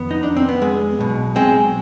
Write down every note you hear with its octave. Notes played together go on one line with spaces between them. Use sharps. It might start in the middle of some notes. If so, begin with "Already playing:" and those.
Already playing: F2 D#3 B3
D#4
D4
C4
B3
G#3
B1 B2
G#3 C4